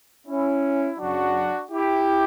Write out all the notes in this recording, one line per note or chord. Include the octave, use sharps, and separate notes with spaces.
C#4 E4
F#2 C#3 F#3 D4 F#4
E4 G4